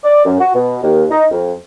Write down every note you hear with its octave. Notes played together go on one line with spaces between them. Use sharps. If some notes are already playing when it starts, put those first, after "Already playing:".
D5
F#2
F#4
B2
D#2
D#4
F2